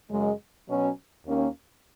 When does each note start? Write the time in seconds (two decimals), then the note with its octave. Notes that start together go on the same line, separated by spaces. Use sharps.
0.10 F#2 C#3 G#3
0.69 B2 F#3 C#4
1.26 D#2 D#3 A#3 C#4